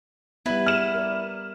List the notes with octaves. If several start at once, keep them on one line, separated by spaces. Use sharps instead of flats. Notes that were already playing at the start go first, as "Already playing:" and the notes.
G3 B3 E4 B4
F6 D#7 E7
A#4 D5